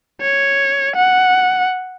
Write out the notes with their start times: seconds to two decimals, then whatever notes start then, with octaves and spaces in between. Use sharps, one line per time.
0.21 C#5
0.96 F#5